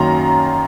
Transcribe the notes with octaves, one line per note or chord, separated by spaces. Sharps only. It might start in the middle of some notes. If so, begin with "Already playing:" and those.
Already playing: F#2 D#3 F#3 A#3 A#5 C6